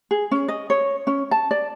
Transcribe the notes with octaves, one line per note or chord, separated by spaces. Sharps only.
G#4
C#4
D#5
C#5
C#4
A5
D5